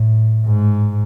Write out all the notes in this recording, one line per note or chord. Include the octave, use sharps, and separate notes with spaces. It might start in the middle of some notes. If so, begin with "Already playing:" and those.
Already playing: A2
G#2